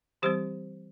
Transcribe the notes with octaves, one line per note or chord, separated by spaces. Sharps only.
E3 G3 C4 G4 C5